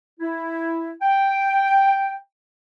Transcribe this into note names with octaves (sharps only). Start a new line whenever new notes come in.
E4
G5